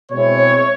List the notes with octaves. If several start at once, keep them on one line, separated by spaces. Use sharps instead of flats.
B2 G#3 C4 E4 C#5